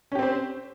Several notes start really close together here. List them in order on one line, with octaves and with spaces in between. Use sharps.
C#4 G4 C4 C5